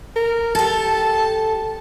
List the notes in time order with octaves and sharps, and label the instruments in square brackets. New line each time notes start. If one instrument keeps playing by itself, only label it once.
[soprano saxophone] A#4
[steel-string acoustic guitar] G4 A4 [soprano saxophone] A5